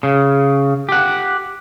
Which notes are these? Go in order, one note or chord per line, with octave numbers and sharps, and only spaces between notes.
C#3
G4 F#5